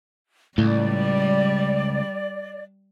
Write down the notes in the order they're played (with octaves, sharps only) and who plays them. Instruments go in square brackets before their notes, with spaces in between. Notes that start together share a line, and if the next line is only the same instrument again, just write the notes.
[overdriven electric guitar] C#2 [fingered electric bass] A2 [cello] G3 [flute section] D5